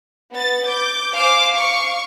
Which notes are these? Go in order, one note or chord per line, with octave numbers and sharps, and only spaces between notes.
B3 A6
D6 G6
C5 F5 G#5 D6
F5 C#6